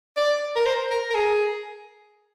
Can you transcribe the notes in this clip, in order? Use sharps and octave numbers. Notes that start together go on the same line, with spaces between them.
D5
A#4
C5
A#4
A#4
G#4